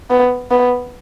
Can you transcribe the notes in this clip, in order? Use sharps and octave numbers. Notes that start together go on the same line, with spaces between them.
B3
B3